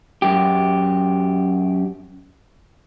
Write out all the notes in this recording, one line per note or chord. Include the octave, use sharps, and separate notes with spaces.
F#2 G4